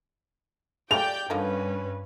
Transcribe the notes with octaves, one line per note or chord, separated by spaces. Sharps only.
G#3 A3 F4 G4 D5 G5 G6 F7
G2 D3 D#3 F3 C#4 B4